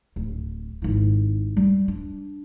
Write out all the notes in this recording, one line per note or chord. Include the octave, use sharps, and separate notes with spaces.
D1
G#1 E4
G3
D4